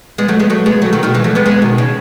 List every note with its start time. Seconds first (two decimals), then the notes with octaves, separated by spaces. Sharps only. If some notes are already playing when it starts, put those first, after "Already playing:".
0.18 G#3 B3
0.28 F#3 A3
0.39 G#3 B3
0.50 F#3 A3
0.66 G#3 B3
0.82 F#3 A3
0.93 D#3 F#3
1.03 B2 D#3
1.14 E3 G#3
1.24 F#3 A3
1.35 G#3 B3
1.46 G#3 B3
1.62 B2 D#3
1.78 C#3